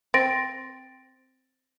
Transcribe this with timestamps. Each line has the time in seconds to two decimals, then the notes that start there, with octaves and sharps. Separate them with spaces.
0.14 C4 A6 A#6 D7